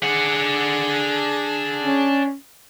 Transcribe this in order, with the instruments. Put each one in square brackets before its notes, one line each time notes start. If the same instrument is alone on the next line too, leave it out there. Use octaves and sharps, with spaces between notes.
[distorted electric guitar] D4 F#5 [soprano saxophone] G#4
[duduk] C#4